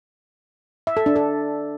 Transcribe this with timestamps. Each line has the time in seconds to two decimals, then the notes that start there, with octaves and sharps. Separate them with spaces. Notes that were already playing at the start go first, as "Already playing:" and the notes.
0.87 E5
0.97 A4
1.06 D4
1.16 A4